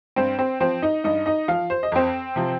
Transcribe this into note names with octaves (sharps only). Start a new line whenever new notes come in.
G2 C4 C5
C4 C5
F3 C4 C5
D#4 D#5
G2 D#4 D#5
D#4 D#5
F3 F4 F5
C5
D#5
F2 C4 C5
C3 F3